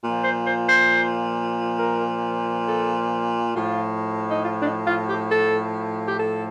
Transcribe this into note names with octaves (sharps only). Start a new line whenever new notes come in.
A#2 F3
C5
C5
C5
A#4
A4
A2 F3 F4
D#4
F4
D4
D#4
F4
G4
A4
G4
A4